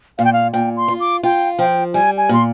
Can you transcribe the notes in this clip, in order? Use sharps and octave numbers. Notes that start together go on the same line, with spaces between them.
A#2 F5
G5
F5
A#2 G5
C6
F4
D6
F4 G5
F3 G5
G3 G#5
G#5
A#2 C6